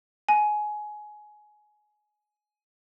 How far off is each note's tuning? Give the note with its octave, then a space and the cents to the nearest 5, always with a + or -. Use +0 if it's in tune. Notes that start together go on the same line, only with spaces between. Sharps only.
G#5 +20